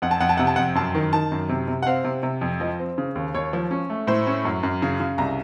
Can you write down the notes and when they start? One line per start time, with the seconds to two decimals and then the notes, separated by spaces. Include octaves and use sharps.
0.02 F2 F#5
0.11 A5
0.20 F2 F#5
0.29 A5
0.37 C3 F#5
0.47 A5
0.56 F2 F#5
0.75 F#2 A5
0.95 D#3
1.13 D#3 A5
1.32 F#2
1.49 C3
1.68 C3
1.83 F#5
1.87 C4 F5
2.04 C3
2.23 C3
2.41 F2
2.60 F3 D#5
2.79 C4
2.98 C#3
3.15 D#2
3.34 D#2 C#5
3.53 F3
3.71 C#4
3.90 A3
4.07 A2 C5
4.27 C#4
4.45 F#2
4.63 F#2
4.82 C#3
5.00 C#3
5.18 C2 A#5